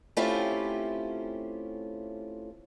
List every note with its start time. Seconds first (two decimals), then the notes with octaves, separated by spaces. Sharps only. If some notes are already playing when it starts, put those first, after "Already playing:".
0.17 A3 C4 C#4 E4 F4 G4